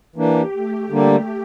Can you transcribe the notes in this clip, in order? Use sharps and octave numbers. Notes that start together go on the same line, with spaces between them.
E3 A#3 D4 G4
A3
D3 G3 A#3